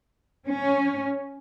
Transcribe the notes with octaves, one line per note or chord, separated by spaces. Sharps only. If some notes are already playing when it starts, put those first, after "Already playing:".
C#4